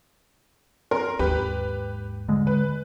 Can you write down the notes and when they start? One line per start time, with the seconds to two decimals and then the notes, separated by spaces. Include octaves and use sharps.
0.91 A#4 C6
1.19 D#2 G#2 G4 B4
2.29 D3 G#3
2.47 B4